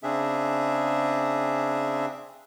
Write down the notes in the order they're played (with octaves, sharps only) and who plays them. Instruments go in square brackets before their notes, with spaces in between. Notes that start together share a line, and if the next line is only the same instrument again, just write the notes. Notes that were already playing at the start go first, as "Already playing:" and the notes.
[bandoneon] C#3 C4 D4 G#4 E5